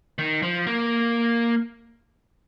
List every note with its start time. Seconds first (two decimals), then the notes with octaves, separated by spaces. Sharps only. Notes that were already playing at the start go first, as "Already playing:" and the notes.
0.18 D#3
0.42 F3
0.67 A#3